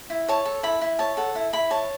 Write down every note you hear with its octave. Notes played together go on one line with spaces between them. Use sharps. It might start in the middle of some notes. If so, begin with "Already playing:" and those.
E4
C#5 A5
A4
E4 B5
E4
C#5 A5
A4 F#5
E4
E4 B5
C#5 A5